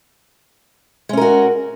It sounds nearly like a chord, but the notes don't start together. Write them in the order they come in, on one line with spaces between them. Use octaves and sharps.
G#3 C#4 A#4 F#4